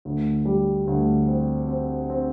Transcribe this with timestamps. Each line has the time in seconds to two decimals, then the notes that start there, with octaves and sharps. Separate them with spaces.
0.05 D2
0.45 G3
0.87 D2
1.28 C4
1.68 C4
2.10 C4